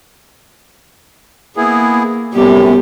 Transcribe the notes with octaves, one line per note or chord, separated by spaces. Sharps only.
A#3 B3 E4 G#4
F#2 A2 C3 G3 B3 G4